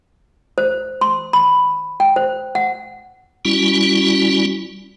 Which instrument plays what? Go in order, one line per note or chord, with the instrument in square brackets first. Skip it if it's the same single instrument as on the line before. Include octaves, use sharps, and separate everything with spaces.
[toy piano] C5
C6
B5
G5
C5
F#5
[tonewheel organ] G3 C#4 E4 F#4